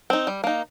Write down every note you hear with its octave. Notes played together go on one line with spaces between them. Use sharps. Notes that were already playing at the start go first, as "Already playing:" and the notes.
C4 D#4
G3
A#3 D#4